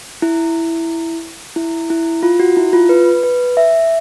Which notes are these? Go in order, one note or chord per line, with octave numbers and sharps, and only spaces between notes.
E4
E4
E4
F4
F#4
E4
F4
B4
B4
E5